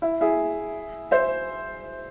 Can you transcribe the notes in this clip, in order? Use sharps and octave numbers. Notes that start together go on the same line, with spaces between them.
E4
E4 G#4
C5 E5